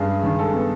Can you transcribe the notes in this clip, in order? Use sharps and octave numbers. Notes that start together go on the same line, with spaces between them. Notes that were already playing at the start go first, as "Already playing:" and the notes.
Already playing: G2 G#4
G#3
D#3
G#3 A4
B3